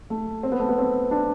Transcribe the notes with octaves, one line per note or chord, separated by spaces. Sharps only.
A3
C4
B3
A3
B3
C4
D4